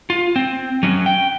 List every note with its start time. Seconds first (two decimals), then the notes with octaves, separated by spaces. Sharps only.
0.10 F4
0.36 C4
0.83 F#3 C#4
1.06 G5